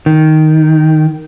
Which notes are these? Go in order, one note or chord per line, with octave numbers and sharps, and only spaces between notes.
D#3